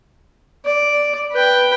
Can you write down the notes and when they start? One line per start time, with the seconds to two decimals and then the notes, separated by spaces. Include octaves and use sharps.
0.65 D5
1.32 B4 G5